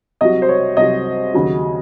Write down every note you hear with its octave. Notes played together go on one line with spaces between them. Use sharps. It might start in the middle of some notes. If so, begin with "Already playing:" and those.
C2 C3 F#3 D#5
C5
C#5
C2 C3 F#3 D#5
D#2 C#3 F#3